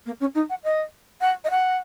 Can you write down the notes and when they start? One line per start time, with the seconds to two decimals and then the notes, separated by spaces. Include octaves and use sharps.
0.06 A#3
0.20 C#4
0.34 D#4
0.49 F#5
0.63 D#5
1.21 F#5
1.44 D#5
1.50 F#5